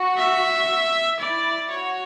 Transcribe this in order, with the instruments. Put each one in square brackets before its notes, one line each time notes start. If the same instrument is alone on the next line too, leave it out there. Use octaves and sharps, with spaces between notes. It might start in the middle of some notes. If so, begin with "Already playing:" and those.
Already playing: [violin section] F#4
[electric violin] E5
[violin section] E4 [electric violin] D5
[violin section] F#4 [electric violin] C#5